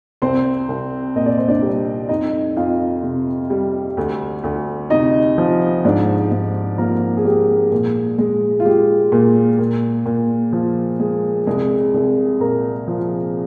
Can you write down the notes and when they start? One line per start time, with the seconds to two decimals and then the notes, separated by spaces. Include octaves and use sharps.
0.22 C2 C4 C5
0.69 C2
1.15 A#2 D#5
1.26 D5
1.38 C5
1.48 D4 D5
1.62 G3
2.09 F2 D#4 D#5
2.56 F2 F4 F5
3.03 C3
3.50 G3
3.97 D2
4.44 D2
4.90 C3 D#4 D#5
5.38 F3
5.85 G#2 D4 D5
6.31 G#2
6.78 F3 A#3 A#4
7.17 G#4
7.25 G#3 G4
7.72 A#2
8.18 G#3
8.60 F4
8.65 G#3 G4
9.12 A#2
9.59 A#2
10.06 A#2
10.52 F3
10.99 G#3
11.47 C2 G#3 G#4
11.94 C2
12.40 A#2 A#3 A#4
12.88 F3